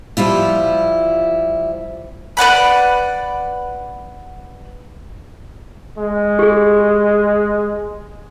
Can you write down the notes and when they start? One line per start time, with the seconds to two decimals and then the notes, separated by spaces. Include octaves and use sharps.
0.17 F3 G3 E4 F4
2.37 B4 D5 F#5 B5
5.98 G#3
6.39 G4 G#4